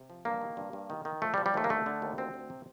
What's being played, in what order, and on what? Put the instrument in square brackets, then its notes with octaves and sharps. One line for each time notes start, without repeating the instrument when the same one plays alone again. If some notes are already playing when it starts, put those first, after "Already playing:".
Already playing: [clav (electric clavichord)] C3
F3
G2 A#3
D#3
G2
G2
D#3
D#3
F3 A3
G3
F3
G3
D#2 A3
A#3
D3 A3
D3
D#2
D2 C4
D2
C3